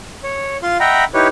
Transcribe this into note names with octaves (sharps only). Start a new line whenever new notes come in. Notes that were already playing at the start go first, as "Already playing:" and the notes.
C#5
F4 F5 C6
D#5 E5 F#5 G5 A#5 B5
D#4 E4 G4 B4 C#5